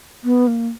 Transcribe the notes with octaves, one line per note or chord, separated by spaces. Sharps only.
B3
A#3